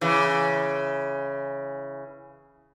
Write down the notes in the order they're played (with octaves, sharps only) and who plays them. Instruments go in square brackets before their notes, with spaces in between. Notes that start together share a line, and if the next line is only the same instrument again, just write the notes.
[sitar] C#3 E3